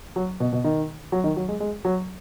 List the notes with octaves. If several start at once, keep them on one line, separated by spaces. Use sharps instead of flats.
F#3
B2
B2
D#3
F#3
D#3
F#3
G#3
G#3
F#3